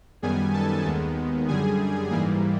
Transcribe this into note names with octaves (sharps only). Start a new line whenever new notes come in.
F#2 D#3 G3 B3 G#4 G#5
A4 A5
D#2 D#3 G#3 B3
F#2 D3 G3 G#4 G#5
G#2 E3 G3 A#3 G#4 G#5